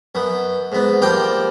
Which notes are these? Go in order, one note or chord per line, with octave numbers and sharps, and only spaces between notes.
F#2 B3
G#2 B3
F3 G3 A#3 G5